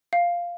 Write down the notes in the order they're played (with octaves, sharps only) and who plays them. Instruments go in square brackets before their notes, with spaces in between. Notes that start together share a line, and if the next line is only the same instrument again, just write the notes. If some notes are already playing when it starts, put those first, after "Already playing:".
[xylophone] F5